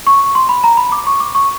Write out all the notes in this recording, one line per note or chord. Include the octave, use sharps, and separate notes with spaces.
C#6
C6
B5
A#5
B5
D6
C#6
D6
C#6